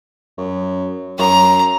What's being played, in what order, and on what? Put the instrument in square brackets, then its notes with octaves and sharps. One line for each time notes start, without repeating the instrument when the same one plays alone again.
[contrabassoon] F#2
[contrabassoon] F#2 [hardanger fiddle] A#5